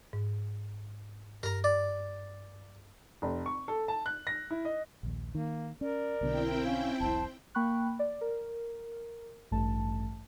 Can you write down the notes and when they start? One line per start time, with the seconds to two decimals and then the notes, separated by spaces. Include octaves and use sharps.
0.13 G#2
1.43 G2 A#4 A#5
1.64 D5
3.22 F1
3.46 C#6
3.68 A4
3.88 A5
4.06 F#6
4.27 A#6
4.51 E4
4.65 D#5
5.03 A#1 D#2
5.35 D#3 A#3
5.81 C#4 A#4 D5
6.21 B1 B2 D3 C4 E4 G5
6.65 C#4 F5
7.00 E1 B1 C5 A5
7.55 A#3 G5 B5 C#6 F#6
7.99 D5
8.21 A#4
9.51 A1 G2 A3 A5